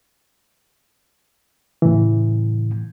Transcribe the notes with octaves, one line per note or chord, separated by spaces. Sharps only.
A2 C#3 E3